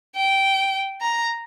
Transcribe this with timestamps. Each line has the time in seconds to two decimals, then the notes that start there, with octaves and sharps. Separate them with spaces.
0.16 G5
1.02 A#5